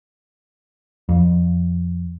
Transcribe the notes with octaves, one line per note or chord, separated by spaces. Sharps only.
F2